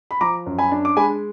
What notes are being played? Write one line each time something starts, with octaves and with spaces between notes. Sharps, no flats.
B5
F3 A#5 D6
F#2
G#5 B5
D4
D6
G#3 G#5 B5